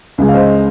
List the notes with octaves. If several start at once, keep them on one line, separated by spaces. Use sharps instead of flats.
C#2 C#3 G#3
F5
C5 D#5